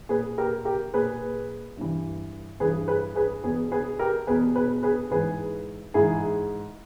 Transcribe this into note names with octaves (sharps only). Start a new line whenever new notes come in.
A#2 G#4 B4
G4 A#4
G4 A#4
A#2 G#4 B4
G2 E3
G2 E3 G#4 B4
G#4 B4
G#4 B4
E2 B2 G#4 B4
G#4 B4
G4 A#4
E2 B2 G#4 B4
G#4 B4
G#4 B4
G#2 E3 G#4 B4
G#2 E3 E4 G#4